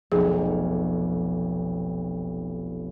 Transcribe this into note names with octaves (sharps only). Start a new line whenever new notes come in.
F1 B1 G#4 F5